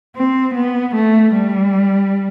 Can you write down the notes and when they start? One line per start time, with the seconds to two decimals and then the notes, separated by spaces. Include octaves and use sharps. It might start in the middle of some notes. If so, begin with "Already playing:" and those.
0.16 C4
0.55 B3
0.95 A3
1.34 G3